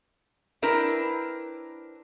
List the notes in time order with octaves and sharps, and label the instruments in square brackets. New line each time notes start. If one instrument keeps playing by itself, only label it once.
[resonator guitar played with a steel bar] C4 D4 E4 A#4 B4